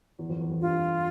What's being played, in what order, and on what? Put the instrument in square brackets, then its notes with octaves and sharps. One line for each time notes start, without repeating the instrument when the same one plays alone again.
[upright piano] E2
F2
E2
F2
[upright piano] G2 [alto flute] F4